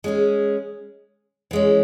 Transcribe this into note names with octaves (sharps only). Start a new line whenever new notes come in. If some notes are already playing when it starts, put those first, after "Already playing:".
G#3 C#4 G#4
E3 G#3 C#4